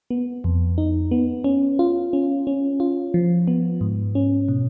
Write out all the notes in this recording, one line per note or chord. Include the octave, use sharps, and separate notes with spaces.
B3
F2
D#4
B3
C#4
F4
C#4
C#4
F4
F3
B3
G#2
C#4
B2